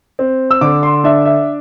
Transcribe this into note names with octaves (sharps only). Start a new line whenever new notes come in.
C4
E6
D3 D6
C6
D4 E5
E5